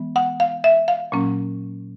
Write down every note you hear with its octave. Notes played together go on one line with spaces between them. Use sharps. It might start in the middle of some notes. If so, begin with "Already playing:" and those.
Already playing: E3 G#3 B3
F#5
F5
E5
F5
A#2 F#3 A#3 C#4